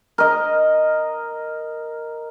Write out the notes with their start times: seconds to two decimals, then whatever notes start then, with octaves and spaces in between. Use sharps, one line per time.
0.18 A#4 D#5